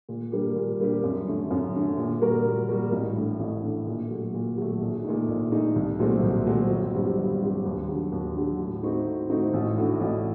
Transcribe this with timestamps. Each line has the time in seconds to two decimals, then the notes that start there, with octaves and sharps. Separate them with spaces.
0.09 A#2
0.32 G3 A#3 D4 G4
0.56 A#2
0.79 G3 A#3 D4 G4
1.03 F#2
1.27 D3 A3
1.50 F#2
1.74 D3 A3
1.97 A#2
2.21 G3 A#3 F#4 A#4
2.45 A#2
2.69 G3 A#3 F#4 A#4
2.92 A1
3.16 A2 A3 D4
3.39 A1
3.63 A2 A3 D4
3.87 A#2
4.10 F#3 A3
4.34 A#2
4.58 F#3 A3
4.81 A#1
5.04 A#2 A3 D#4
5.28 A#1
5.52 A#2 A3 D#4
5.76 C2
5.99 A#2 F#3 A3 C4
6.23 C2
6.46 A#2 F#3 A3 C4
6.70 G1
6.94 G2 F#3 C4 G4
7.18 G1
7.41 G2 F#3 C4 G4
7.65 D#2
7.88 D3 F#3
8.12 D#2
8.35 D3 F#3
8.59 A2
8.83 A3 C4 D#4 F#4
9.06 A2
9.30 A3 C4 D#4 F#4
9.53 A1
9.77 A2 A3 D4 F#4
10.01 A1